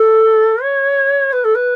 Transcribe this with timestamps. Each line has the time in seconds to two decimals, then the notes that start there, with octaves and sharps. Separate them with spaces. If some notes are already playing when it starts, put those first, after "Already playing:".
Already playing: A4
0.62 C#5
1.32 B4
1.44 A4
1.55 B4